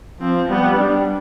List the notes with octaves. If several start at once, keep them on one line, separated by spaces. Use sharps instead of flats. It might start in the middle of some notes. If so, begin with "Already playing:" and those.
F3 C4
G3 B3
G3 D4